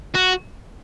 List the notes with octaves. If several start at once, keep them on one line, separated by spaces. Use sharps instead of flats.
F#4